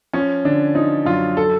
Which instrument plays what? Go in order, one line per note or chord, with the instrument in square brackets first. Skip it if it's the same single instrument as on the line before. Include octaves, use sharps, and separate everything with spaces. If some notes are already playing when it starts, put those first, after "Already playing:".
[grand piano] F3 C#4
D3 D4
F3 D#4
F#2 F4
A4